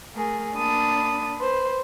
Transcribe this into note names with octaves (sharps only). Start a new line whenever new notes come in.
A3 G#4 A#4
A#3 D4 A5 B5 D#6
B4 C5